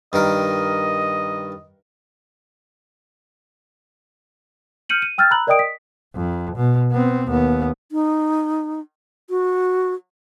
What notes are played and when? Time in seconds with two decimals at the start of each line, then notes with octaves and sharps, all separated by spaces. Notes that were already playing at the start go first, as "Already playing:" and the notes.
0.13 G2 D#3 A#4 D#5
4.89 F6 G6 C#7 D#7 F#7
5.02 D#7
5.18 G5 E6 F6 G6 A6
5.31 A#5 B5 E6 F#6 F#7
5.47 A#4 D5 D#5 G5 D#6 D7
5.59 B6
6.15 F2
6.56 B2
6.91 B3 C4
7.28 D#2 B3
7.92 D#4
9.30 F#4